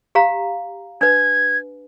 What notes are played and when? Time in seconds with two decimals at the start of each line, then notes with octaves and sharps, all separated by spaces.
0.15 G4 F5 A#5
1.01 D4 B4 G#6